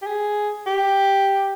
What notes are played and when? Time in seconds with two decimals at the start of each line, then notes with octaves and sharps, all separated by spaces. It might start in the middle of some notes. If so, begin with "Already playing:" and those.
0.02 G4
0.06 G#4
0.67 G4